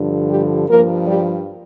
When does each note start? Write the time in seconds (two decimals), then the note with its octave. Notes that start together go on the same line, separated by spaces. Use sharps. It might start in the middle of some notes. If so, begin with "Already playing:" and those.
Already playing: G2 D3 F3
0.29 G3 G4
0.68 G2 F3 A#3 A#4
1.07 G3 G4